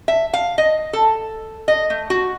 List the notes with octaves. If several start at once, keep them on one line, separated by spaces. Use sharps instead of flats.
E5
F5
D#5
A4
D#5
A3
F#4